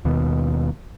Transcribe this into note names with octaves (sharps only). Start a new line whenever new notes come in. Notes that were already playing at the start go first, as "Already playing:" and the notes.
D#2 B2